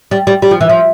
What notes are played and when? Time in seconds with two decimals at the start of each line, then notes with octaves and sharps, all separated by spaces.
0.11 G3
0.27 G3
0.42 G3
0.51 F3
0.61 E3
0.69 F3